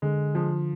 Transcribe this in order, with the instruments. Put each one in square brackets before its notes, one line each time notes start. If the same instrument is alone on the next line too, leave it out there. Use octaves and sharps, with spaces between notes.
[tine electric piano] D3 [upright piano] G#3
[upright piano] F3